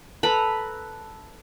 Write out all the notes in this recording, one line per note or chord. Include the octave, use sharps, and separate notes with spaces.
A4 B4 A#5 B5